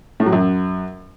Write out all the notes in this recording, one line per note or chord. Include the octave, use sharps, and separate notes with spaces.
A2
F#3
F#2